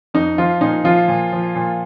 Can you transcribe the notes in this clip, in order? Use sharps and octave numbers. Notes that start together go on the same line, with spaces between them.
F2 D#4
F3 F4
A#2 D#4
F3 F4
A#2
F3
A#2